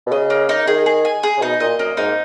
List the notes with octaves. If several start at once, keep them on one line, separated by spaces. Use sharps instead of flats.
B2
C#3 D#5
A#3
D#4
D#3 G#4
G#4
G#5
G#4
C#3
B2 D#4
A#2 D#5
F#2 A#3
G#2 D#4